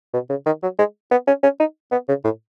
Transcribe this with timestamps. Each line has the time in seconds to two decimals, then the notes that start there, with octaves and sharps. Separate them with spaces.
0.13 B2
0.30 C#3
0.46 D#3
0.62 F#3
0.78 G#3
1.11 B3
1.27 C#4
1.43 C#4
1.59 D#4
1.91 B3
2.08 C#3
2.24 A2